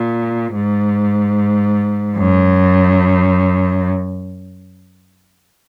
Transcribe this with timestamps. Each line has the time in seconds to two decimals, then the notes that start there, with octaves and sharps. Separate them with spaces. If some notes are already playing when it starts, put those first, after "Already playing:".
Already playing: A#2
0.54 G#2
2.17 F#2